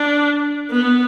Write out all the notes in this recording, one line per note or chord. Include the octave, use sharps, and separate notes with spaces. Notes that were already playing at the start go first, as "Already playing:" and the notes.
Already playing: D4
B3